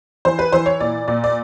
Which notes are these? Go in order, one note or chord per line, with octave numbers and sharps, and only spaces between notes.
E3 C5
B4
E3 C5
C#5
A#2 D5
A#2 D5
D5